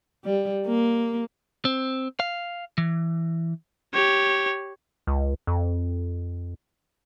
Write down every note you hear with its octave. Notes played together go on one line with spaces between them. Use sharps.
G3
A#3
C4
F5
E3
G4 C#5
C#2
F2